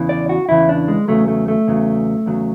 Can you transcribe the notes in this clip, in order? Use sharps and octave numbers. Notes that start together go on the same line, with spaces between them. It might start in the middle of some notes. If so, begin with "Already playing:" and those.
Already playing: E2 C#3 E3
D5
F#4
E2 C#3 E3 E4
D4
G#3
E2 C#3 F#3 A3
A3
A3
E2 C#3 F#3
E2 C#3 F#3